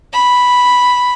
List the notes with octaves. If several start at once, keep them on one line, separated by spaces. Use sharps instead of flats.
B5